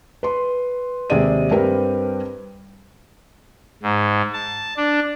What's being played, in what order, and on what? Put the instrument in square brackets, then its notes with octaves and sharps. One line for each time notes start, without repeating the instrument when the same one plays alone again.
[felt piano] B4 C6
D#2 C3 G#3 G#4 D5 D#7
G2 G3 C4 A#4 B4
[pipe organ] G#2
A5
D4